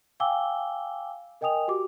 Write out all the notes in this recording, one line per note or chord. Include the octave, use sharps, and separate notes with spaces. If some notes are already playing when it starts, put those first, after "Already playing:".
F5 G5 G#5 D6 E6 G7
A#4 D#5 G5 G#5 D#6 F7
F#4 G4 D6